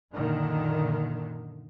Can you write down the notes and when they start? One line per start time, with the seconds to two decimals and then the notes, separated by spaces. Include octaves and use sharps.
0.13 F#2 A#2 D3 D#3